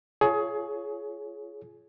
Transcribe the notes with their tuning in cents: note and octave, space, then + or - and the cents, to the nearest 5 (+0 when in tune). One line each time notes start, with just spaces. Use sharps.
F4 -20 G#4 +25 C#5 +5